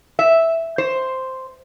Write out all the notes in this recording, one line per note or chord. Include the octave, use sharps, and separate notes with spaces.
E5
C5